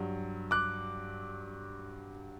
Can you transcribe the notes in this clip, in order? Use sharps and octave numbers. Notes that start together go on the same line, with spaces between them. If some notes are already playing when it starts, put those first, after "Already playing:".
Already playing: G2 F#3
D6 F#6